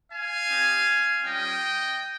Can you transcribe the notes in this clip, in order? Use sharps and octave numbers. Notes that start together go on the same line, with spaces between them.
F5 G#5
C4 D#4 G4
G3 C#4 F4 D#5 G5